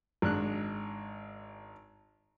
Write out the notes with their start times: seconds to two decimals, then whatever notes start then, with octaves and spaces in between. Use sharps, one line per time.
0.22 G#1 G#3 D4 F#6